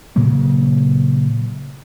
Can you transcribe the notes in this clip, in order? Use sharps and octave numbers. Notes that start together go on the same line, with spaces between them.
A#2 C#3 F#3 A#3